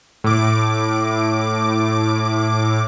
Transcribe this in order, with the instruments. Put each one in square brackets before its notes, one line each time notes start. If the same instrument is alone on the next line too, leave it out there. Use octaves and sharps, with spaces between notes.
[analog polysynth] A2 D6